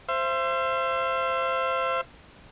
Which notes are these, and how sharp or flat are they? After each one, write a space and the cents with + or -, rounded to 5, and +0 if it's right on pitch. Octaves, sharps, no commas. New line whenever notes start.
C5 +0 E5 +40